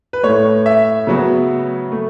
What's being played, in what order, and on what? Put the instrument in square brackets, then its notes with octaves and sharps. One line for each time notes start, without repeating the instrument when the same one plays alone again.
[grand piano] B4
A2 A3 C#5
E5
C#3 F#3 B3
A3